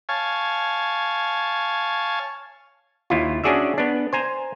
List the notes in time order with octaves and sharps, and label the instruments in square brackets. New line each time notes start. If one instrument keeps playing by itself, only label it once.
[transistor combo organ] C#5 F5 G#5 A5
[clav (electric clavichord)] D#2 E4 F4
C#4 D4 F#4 G#4 D5 E5
B3 D4
C5 G#5 A#5